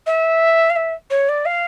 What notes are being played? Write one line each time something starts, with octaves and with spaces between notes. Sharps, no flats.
E5
F5
E5
C#5
D5
F5